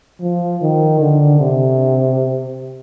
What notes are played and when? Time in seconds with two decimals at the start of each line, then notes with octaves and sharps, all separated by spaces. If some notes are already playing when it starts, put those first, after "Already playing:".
0.21 F3
0.61 D#3
1.01 D3
1.40 C3